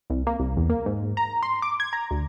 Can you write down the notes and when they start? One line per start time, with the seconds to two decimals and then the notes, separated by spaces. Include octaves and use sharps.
0.10 C2
0.27 A#3
0.40 C2
0.57 E2
0.70 A#3
0.86 G#2
1.17 A#5
1.43 C6
1.62 D6
1.80 G#6
1.93 A#5
2.11 D2